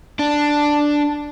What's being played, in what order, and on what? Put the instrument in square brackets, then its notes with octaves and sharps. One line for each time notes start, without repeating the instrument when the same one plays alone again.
[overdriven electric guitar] D4 [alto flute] A5